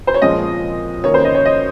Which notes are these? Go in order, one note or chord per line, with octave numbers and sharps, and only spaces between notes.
C5
C#5
A#2 F3 G#3 C4 D#5
D#3 A#3 C#4 C#5
C5
D#5
C#5
D#5